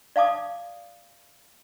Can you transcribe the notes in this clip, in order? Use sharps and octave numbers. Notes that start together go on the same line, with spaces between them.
D5 F5 A5 D6 D#6